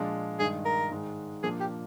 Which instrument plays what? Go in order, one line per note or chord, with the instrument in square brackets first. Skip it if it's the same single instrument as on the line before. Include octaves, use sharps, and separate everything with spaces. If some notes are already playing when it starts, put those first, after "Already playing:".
Already playing: [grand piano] A#2 F3 G#3 D4
[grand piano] G2 D#3 G#3 [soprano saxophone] G#4
[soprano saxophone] A#4
[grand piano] G#2 D#3 G#3
[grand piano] A#2 F3 A#3 D4 [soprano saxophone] G#4
[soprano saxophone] G4